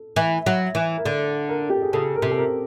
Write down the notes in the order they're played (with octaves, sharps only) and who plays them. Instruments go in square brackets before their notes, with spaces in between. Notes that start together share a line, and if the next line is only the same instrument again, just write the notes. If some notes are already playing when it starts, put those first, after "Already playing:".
Already playing: [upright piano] A4
[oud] E3
F#3
E3
[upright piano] A#4
[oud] D3 [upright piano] A4
[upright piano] A#4
G4
G#4
[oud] C#3 [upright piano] A4
[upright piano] A#4
[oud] C3
[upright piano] A4
A#4